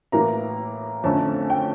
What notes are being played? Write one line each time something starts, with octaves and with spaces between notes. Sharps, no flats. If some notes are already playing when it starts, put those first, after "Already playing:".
A2 E3 A#3 A#5
F2 D3 A3 C#4 A5
G5